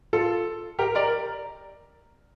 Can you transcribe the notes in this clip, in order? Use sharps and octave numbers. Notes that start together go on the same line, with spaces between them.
F4 A4
G4 A#4
A#4 D5